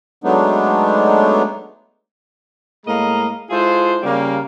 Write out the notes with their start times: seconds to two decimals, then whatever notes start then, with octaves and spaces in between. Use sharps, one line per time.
0.24 F#3 G#3 A3 B3 D4 D#4
2.86 A2 G#3 A#3 D#5 F5 A#5
3.50 G#3 E4 F4 G#4 A4 C5
4.03 C#3 G3 A#3